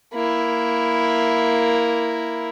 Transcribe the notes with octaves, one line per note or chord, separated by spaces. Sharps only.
A#3 E4